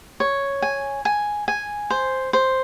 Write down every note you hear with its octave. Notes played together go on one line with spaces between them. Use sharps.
C#5
G#5
G#5
G#5
C5
C5